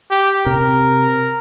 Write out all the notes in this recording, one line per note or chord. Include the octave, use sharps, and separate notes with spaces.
G4
C3 A#4